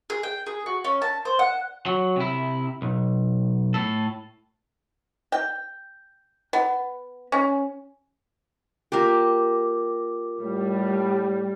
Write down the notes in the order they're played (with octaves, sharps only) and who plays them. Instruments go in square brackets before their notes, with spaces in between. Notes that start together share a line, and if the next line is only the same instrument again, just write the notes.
[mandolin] G#4
G5
G#4
F#4
C#4
A5
C5
F#5
[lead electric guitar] F#3
C3 E4
B1
A2 A4
[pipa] G5
B3
C#4
[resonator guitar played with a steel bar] A#3 G4 [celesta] F4 A#4 D6
[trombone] A2 [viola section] G3